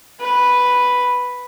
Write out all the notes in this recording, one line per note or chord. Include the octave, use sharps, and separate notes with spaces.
B4